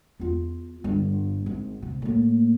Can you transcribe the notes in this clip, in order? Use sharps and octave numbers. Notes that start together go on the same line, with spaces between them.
E2 F4
G1 G2
G#1
C3
A2 A#3